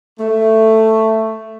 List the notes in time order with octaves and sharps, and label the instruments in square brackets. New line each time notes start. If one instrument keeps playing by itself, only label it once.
[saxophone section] A3